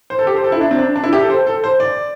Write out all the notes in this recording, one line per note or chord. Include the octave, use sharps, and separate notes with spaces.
C5
A4
G4
C5
A4
E4
D4
C4
D4
D4
E4
G4
A4
C5
A4
C5
D5